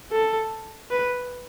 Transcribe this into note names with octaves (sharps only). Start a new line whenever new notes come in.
A4
B4